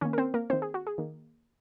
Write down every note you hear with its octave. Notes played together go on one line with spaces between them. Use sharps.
D#3 A#3 C#4 C#5
A#4
C4 C5
A#3 A#4
D#3 A#3 C4 C5
G#4
F#4
G#4
D#3 A#3